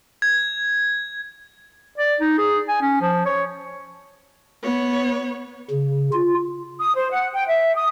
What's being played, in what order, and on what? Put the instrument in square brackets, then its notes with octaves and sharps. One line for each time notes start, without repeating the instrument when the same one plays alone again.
[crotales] G#6
[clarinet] D5
D#4
G#4
G#5
C#4
F3
C#5
[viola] B3 C#5
[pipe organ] C#3
F4
[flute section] D#6
C5
F#5
G5
E5
D#6